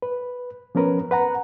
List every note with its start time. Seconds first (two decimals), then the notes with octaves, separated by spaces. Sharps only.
0.02 B4
0.75 F3 B3 C#4 A#4 B4
1.11 B4 F#5 A#5